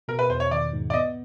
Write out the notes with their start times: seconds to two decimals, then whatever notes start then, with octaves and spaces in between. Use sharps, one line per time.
0.08 B2 A#4
0.19 B4
0.30 E2 C5
0.40 C#5
0.51 D#3 D5
0.73 G#2
0.90 D5
0.93 B3 D#5